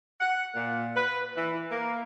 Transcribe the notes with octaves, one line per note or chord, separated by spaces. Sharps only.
F#5
A#2
B4
E3
A#3